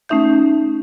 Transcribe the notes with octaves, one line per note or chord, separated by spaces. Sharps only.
A3 C#4 D#4 E5 G6